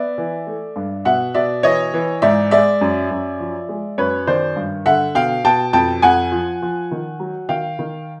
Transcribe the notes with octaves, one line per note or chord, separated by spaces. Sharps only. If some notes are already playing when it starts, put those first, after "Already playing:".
Already playing: B3 D5 E5
E3
A3
G2
B2 E5 F#5
B2 D5 E5
E3 C#5 D#5
E3
G#2 D5 E5
G#3 D5 E5
F#2
F#2
F3
G#3
F#2 B4 C#5
D#3 C5 D5
G2
D3 E5 F#5
B2 F5 G5
B2 G5 A5
F2 G5 A5
F2 F#5 G#5
F3
F3
D#3
F#3
D#3 F5 G5
D#3